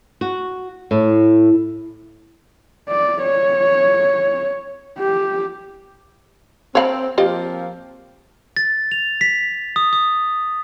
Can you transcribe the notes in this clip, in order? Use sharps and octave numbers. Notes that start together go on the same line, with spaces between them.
F#4
A2
D5
C#5
G4
C4 C#5 F5 B5
F3 A#3 C4 F4 G4 D#5
A6
F7
B6
D#6
D#6